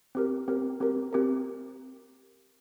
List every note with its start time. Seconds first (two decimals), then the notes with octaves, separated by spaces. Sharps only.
0.15 C4 G4 A#4
0.48 C4 G4 A#4
0.80 C4 G4 A#4
1.13 C4 G4 A#4